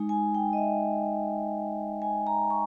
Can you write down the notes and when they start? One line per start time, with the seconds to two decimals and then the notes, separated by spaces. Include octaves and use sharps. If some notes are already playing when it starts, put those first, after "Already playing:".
Already playing: G#3 D#4
0.09 G#5
0.35 G5
0.53 D#5
0.57 E5
2.02 G#5
2.27 A#5
2.50 C#6